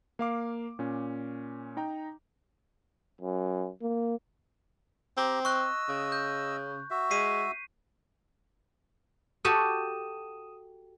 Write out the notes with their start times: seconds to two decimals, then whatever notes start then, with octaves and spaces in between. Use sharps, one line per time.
0.19 A#3 F5 D6
0.79 A#2 C#4
1.77 D#4 G5 A#5
3.21 F#2
3.82 A#3
5.17 C4 G4 A#5
5.45 D#5 C#6 E6 F#6
5.89 C#3
6.12 G6
6.91 F#4 E5
7.11 G#3 B6 C7 D#7
9.45 F#4 G4 A4 D#6 D#7 E7